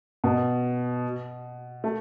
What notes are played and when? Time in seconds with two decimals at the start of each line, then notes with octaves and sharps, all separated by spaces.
0.24 B2
1.84 A3